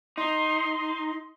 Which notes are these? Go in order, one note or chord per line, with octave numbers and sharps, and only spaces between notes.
D#4 C6